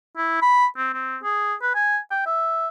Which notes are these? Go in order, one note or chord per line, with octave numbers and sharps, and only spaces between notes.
E4
B5
C4
C4
G#4
B4
G#5
G5
E5